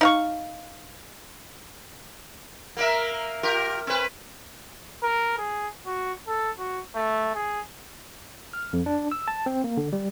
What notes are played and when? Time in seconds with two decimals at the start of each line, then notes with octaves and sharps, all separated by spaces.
0.01 D#4 F5 C#6
2.77 A#3 A#4 E5
3.43 F4 G4 A#4
3.87 C4 B4
5.03 A#4
5.38 G#4
5.86 F#4
6.28 A4
6.58 F#4
6.95 A3
7.35 G#4
8.53 F6
8.73 F2
8.86 D4
9.12 E6
9.28 A5
9.46 C4
9.64 A#3
9.77 D3
9.93 G3